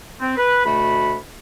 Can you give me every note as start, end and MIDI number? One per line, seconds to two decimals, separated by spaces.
0.20 0.33 60
0.37 0.61 71
0.65 1.15 38
0.65 1.15 47
0.65 1.15 57
0.65 1.15 66
0.65 1.15 83